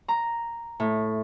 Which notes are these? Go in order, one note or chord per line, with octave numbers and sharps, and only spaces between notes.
A#5
A2